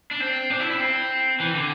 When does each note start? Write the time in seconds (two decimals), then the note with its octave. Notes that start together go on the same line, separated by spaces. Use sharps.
0.11 D4
0.20 C4
0.50 D4
0.60 E4
0.71 E4
0.80 C4
1.40 E3
1.55 D3